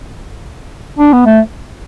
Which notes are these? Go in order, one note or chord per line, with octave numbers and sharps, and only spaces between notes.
D4
B3
A3